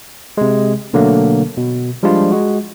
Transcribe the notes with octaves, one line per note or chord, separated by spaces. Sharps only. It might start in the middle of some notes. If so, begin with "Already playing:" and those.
C3 G#3
B2 D3 F#3 A3 A#3
B2
F3 G3 G#3 D4 F4
G#3 F#4